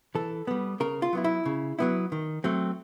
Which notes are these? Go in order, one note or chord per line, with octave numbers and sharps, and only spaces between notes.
E3 A4
G3 B3
C#3 A#4
F4
F#3 B3 E4
E4
C#3
F#3 B3 E4
D#3
F#3 A3 C4